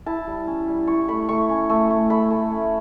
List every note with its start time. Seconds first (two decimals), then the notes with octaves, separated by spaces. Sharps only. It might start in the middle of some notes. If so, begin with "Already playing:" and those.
0.06 E4 A5
0.27 G3
0.47 C#4
0.68 G3
0.87 E4 C#6
1.08 A3 B5
1.29 A3 C#6
1.49 C#4
1.70 A3
1.90 A3
2.10 A3 B5
2.30 A3
2.52 C#4